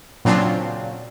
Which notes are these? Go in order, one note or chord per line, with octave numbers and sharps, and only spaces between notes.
A#2 C#3 F#3 C4 D4 F4